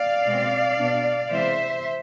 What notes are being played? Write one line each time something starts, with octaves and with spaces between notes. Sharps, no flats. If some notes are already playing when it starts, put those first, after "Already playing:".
Already playing: D5 F5
B2 G#3 C4
B2 B3 D4
C3 E3 G#3 C5 E5